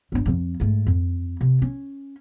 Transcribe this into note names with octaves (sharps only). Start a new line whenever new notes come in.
G1 D4
D1 F2
G#2 A3
F2
C3
C#4